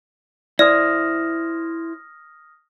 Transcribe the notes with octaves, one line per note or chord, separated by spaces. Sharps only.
E4 C5 D5 D#6 F6 A#6